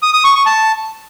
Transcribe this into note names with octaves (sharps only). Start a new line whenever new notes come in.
D#6
D#6
C#6
C#6
A5